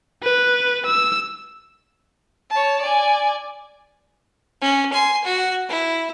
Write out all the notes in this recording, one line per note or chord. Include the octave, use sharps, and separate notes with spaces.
B4
E6
C#5 A5
D5 G#5
C#4
G#5 C6
F#4
E4